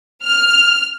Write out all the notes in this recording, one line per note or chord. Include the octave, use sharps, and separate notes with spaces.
F6